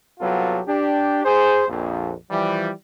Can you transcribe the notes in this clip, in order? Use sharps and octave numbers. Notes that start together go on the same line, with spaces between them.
C2 F#3 B3 F4 G4 A4
D4 G4
G#4 C5
A#1 F2
E3 F3 G3